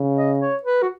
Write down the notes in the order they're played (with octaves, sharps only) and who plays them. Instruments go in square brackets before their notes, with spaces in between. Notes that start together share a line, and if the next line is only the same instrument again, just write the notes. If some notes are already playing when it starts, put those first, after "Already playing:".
Already playing: [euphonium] C#3
[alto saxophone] D#5
C#5
B4
F#4